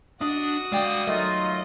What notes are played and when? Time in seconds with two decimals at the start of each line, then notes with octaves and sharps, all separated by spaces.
0.21 D4 F#4 D#5 D#6
0.72 G#3 D5 F5 G5
1.07 D#3 F#3 A3 F4 D#5